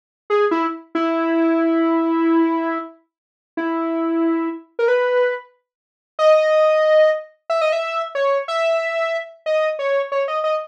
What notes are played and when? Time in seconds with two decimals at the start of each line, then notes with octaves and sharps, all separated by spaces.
0.30 G#4
0.51 E4
0.95 E4
3.57 E4
4.79 A#4
4.88 B4
6.19 D#5
7.50 E5
7.61 D#5
7.72 E5
8.15 C#5
8.48 E5
9.46 D#5
9.79 C#5
10.12 C#5
10.28 D#5
10.44 D#5